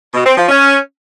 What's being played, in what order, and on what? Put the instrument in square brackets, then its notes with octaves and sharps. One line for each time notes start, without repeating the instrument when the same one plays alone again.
[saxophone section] B2
C4
F3
C#4